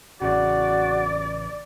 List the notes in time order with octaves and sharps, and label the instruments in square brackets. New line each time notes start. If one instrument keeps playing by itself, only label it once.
[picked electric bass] A1 C#3 [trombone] F#4 [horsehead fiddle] D5